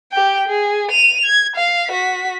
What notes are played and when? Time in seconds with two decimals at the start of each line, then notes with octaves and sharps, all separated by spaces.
0.12 G4 G5
0.48 G#4
0.90 D#7 F7
1.25 G#6
1.56 F5
1.87 F#4 B6